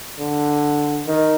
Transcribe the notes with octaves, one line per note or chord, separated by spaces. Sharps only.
D3
D#3